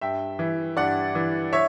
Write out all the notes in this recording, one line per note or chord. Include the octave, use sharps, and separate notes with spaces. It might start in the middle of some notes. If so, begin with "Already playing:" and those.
G2 E5 G5
E3
G2 D5 F#5
E3
C#5 E5